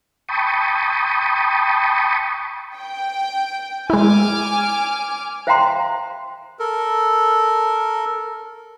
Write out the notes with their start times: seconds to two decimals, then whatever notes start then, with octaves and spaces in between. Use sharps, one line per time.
0.29 G5 A5 B5 C#6 D#6
2.76 G5
3.90 G#3 E4 G#5 D6 F6
5.47 C5 E5 F5 G5 A#5 C6
6.59 A4 A#4